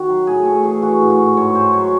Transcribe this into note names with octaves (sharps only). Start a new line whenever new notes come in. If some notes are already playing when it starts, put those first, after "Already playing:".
Already playing: D#3 F#4
F#3
A2 G#4
A2 A4
E3 G#4
E3 F#4
A2
F#4
A2
G#2 C#5
G#2 C5
F#3 C#5